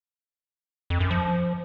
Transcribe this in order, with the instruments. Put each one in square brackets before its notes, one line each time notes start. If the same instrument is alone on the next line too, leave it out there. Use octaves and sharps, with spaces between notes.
[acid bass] F2
F#2
F3